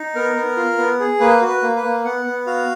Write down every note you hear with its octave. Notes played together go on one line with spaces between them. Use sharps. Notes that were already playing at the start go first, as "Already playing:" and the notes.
Already playing: D#4
B3 A#4
B3
F4
B3
G#4
A#3 B4
F#4
B4
A#3
B4
A#3
B3 F#5
B3
F#4 F5